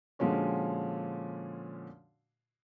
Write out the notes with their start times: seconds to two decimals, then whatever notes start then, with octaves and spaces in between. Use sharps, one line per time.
0.19 A#2 D3 F3 G#3 C#4 F#4